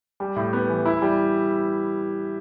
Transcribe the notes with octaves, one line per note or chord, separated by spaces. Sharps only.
G3
A2
B3
E3
E4
G3